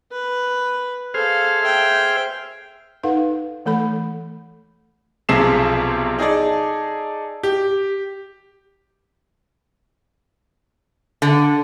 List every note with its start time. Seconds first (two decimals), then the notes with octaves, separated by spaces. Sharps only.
0.12 B4
1.14 G#4 A4 C5 F5 F6
1.61 E5 G5
3.03 D#4 A4 B4 F5 F#5
3.66 E3 A3 A4 B5
5.29 B1 C3 F3 G#4 C7 E7
6.19 D#4 G#4 A4 D5
7.43 G4
11.22 D3